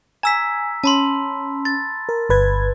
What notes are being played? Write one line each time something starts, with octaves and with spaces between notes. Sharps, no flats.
G#5 A#5 E6 B6
C#4 A5 B5 C6
A6
A#4
G1 B4 G#6